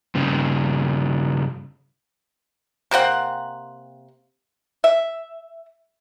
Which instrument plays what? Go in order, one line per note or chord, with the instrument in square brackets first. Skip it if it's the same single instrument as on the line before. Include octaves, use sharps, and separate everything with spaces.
[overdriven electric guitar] G2 C#3
[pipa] C3 A#3 C4 F#5
E5